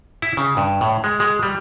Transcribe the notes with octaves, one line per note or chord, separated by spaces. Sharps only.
E4
C#3
G2
A2
G#3
G#3
G3